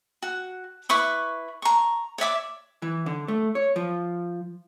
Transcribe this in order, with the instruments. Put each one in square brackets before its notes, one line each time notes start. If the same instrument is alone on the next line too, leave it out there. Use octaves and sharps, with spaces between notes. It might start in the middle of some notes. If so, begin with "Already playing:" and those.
[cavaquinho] F#4
E4 B4 C#6 D6
A#5 C#6
C#5 D5 E5 D6
[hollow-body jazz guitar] E3
D3
A3
C#5
F3